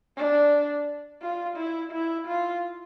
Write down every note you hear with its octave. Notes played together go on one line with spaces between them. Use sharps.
D4
F4
E4
E4
F4